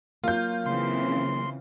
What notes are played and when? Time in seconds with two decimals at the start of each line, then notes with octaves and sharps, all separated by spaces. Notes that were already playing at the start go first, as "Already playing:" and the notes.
0.24 F#3 A#3 F4 G6
0.66 C#3 E3 C4 C6